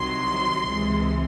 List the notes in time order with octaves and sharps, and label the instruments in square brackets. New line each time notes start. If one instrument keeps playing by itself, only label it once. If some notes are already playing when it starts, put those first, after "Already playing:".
Already playing: [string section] C2 C3 D#3 F#3 C6
C#2 C3 E3 G#3